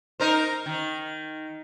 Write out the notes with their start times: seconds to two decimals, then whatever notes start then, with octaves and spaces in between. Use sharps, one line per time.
0.20 D#4 A#4 C5
0.66 D#3